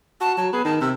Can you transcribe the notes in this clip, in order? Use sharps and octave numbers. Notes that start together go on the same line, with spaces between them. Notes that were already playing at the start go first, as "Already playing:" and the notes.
F#4 A5
F#3 A5
B3 G#4
D#3 A5
C3 E6